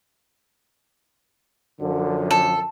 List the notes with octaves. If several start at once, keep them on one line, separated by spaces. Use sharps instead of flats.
F#2 D3 F3
A4